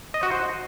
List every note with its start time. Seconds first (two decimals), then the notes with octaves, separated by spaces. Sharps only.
0.14 D#5
0.23 F#4
0.31 C5